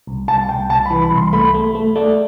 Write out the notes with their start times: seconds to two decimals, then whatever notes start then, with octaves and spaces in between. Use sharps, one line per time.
0.07 C2
0.28 C2 A5
0.49 C2 G5
0.69 C2 A5
0.85 B5
0.90 E3
1.02 B5
1.11 C2
1.17 C6
1.33 A3 B5
1.54 A3
1.75 A3
1.95 A3 D5